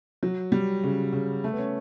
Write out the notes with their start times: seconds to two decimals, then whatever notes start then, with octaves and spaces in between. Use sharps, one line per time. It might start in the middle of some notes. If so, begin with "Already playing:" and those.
0.23 F#3
0.52 G3
0.83 C#3
1.13 C#3
1.44 A3
1.53 B3
1.59 C#4